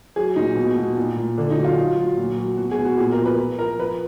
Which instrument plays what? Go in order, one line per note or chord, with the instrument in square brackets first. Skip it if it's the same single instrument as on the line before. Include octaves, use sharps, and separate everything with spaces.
[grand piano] F#3 G#4
A#2 D#4
B2
B2
A#2
A#2
D3 D4
D#4
F#3
F4
F#3
F#3
A#2
F#3
B2 F#4
G#4
B2
F#4
A#2 G#4
A#4
F3
B4
F3
F3 A#4
F3 B4